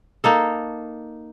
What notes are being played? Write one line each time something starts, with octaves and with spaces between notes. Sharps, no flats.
A#3 D#4 A4